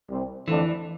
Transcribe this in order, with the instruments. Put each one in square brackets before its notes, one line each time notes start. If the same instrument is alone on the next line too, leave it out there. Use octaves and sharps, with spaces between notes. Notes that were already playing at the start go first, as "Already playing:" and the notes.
[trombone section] C2 C3 G3 C4
[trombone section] F2 D3 F3 A3 D4 [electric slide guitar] E3